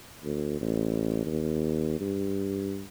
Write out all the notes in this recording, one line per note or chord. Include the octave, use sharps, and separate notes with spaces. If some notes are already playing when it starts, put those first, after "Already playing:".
D2
A1
D#2
G2